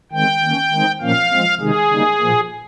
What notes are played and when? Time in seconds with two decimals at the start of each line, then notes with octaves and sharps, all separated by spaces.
0.12 D#3 G#3 C4 G5
0.43 D#3 A#3 C#4
0.71 D#3 G#3 C4 D#4
1.01 A#2 F3 A#3 C#4 F5
1.30 F3 G#3 C4
1.60 C3 D#3 G#3 D#4 G#4
1.90 C#3 G3 A#3 D#4
2.19 A#2 F3 A#3